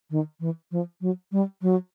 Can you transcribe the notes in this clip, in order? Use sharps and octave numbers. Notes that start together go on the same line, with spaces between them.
D#3
E3
F3
F#3
G3
F#3